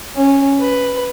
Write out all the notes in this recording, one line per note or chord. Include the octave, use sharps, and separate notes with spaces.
C#4
B4